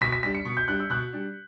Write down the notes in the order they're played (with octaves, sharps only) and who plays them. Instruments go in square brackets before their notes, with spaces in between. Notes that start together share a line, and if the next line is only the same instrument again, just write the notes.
[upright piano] B2 [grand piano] B6
[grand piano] B6
[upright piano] G3 D4 [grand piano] B6
[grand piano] C#7
[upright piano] B2
[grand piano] G6
[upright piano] G3 D4 [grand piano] F#6
[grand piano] E6
[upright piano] B2 [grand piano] F#6
[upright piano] G3 D4